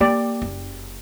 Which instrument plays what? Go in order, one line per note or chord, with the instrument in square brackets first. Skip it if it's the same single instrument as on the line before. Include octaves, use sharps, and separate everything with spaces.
[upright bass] A#3 [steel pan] G4 D5
[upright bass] F#1